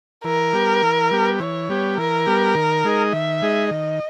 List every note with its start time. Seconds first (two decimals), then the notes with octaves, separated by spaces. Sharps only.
0.24 E3 A#4
0.53 G3 B3 G4
0.82 E3
1.11 G3 B3 G4
1.40 E3 C#5
1.69 G3 B3 G4
1.98 E3 A#4
2.26 G3 B3 G4
2.55 D#3
2.84 G#3 D#4 G#4 D#5
3.13 D#3 E5
3.42 G#3 D#4 G#4 D#5
3.71 D#3 D#5